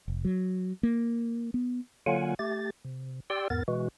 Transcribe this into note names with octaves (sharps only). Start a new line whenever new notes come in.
F1
F#3
A#3
B3
D3 F#3 A#3 F4 F#5 G#5
A3 G4 A6
C3
G4 D5 G5 C6 E6
E2 G#2 B3 A#4 A6
B2 E3 G#3 F#4